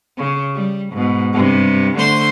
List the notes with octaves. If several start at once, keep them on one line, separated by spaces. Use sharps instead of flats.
C#3
G3
G#2 B2
G2 C3
D3 A3 C5 C6